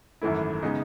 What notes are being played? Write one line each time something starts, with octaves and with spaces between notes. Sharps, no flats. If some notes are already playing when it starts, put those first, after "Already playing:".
G#1 F#2 E3 A3 E4
C#3 G#3 B3 D#4